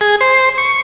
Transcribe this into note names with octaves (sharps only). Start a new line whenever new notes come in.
G#4
C5
C#6